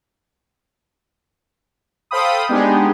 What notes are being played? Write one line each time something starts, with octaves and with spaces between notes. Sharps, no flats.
A4 C5 F5 G5 B5 D#6
G#3 B3 D4 D#4 G4 G#4